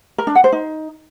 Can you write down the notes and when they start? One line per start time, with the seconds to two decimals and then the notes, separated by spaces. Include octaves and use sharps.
0.18 A#4
0.27 D4
0.35 F#5
0.44 C5
0.52 D#4